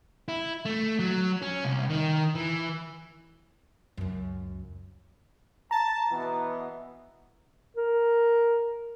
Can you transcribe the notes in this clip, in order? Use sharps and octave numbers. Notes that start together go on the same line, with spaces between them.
E4
A3
F#3
C#4
C2
D#3
E3
C#2 F#2
A5 A#5
B2 E3 B3
A#4